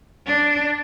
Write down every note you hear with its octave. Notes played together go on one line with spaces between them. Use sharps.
D4